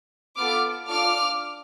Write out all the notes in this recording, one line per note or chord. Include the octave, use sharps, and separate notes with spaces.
B3 F4 A4 D6 F6
D4 F4 A4 D6 F6